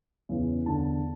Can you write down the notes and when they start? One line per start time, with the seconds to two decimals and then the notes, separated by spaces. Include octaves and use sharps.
0.29 E2 C#3 E3
0.66 E2 D3 A5